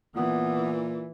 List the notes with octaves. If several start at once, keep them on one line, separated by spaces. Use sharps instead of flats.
A#2 E3 B3